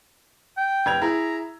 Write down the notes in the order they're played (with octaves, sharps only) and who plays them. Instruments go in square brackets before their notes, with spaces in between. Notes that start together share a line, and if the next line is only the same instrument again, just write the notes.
[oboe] G5
[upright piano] F1 G#6 F7
[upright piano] E4 G#4 [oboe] A#5